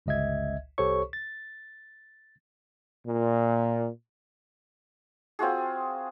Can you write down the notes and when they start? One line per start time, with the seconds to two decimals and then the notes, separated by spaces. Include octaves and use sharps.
0.06 G1 C#2 D#5 E5 G#6
0.78 C2 G4 A4 C5 C#5 C#6
1.13 A6
3.07 A#2
5.39 C4 F4 F#4 G#4